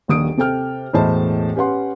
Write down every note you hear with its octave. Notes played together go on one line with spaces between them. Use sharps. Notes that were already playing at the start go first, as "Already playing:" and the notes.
D#1 A#1 D#2 D#6 D7
C3 A4 G5 F6
E1 A2 E3 C5 D#5 A5
C#4 G4 B4 F#5 C6